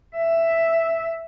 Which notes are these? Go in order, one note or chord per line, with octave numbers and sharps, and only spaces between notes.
E5